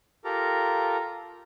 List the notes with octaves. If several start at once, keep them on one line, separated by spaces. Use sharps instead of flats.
F4 G4 A4 A#4 A#5